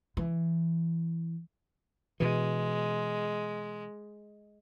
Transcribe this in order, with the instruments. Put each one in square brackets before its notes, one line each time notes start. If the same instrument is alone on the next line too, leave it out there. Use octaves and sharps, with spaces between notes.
[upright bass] E3
[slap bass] B2 E3 [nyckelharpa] G#3